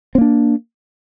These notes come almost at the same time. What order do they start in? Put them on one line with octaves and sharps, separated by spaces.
C4 A#3 D4